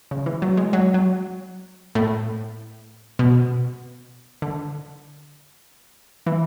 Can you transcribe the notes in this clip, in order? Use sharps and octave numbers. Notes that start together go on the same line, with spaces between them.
C#3
E3
F#3
G#3
F#3
F#3
A2
B2
D3
E3